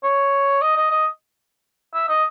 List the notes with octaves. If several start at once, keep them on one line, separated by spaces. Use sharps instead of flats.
C#5
D#5
D#5
D#5
E5
D#5